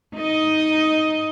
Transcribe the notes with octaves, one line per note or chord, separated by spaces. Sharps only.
D#4 D#5